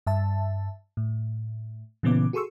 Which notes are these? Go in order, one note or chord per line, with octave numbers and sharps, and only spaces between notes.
G2 E5 A5
A2
A#2 C#3 E3 B3 C#4 D6
F#4 G#4 A4 C6 C#6 E6